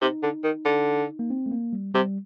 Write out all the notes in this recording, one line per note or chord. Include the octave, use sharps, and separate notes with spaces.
C3 D#4
D3
D#3
D3
A#3
C4
A3
A#3
G3
C3 G3